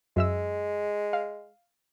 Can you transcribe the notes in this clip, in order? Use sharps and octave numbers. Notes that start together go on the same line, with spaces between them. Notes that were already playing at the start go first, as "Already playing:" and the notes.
F#2 G#3 E5 E6
F5